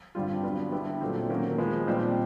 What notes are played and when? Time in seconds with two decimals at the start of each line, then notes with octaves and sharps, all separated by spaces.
0.15 G2 D3 G3 C4 F4
0.44 D3 F#3 B3
0.72 D3 G3 B3 E4 G4
1.01 A#2 F#3 A3 C4
1.29 D#3 F#3 A#3 C#4
1.58 F3 G#3 B3
1.87 A#2 G3 C4 D#4 G4